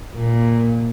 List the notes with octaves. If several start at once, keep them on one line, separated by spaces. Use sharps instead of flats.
A#2